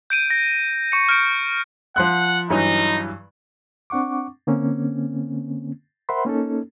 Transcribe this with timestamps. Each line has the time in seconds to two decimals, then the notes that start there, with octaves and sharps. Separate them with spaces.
0.10 G6 D7 D#7
0.30 A#6
0.92 C#6 C#7
1.09 F6 G6 D7
1.96 F3 F#5 C6 F#6
2.50 G2 E3 F#3 D#4
3.90 C4 D4 F#5 C#6 D6
4.47 D3 A#3 C4 C#4
6.09 A#4 C5 E5 F#5 B5 C6
6.25 A#3 C#4 D#4 A4